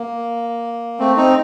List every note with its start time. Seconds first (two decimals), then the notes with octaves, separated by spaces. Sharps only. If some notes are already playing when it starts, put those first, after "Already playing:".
Already playing: A#3
0.99 A3 C4
1.16 C4 D#4